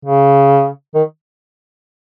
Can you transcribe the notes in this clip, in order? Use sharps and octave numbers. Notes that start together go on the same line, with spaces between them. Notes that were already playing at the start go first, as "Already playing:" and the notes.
C#3
D#3